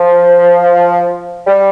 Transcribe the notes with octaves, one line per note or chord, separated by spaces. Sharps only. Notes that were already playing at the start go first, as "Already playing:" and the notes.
Already playing: F3
G3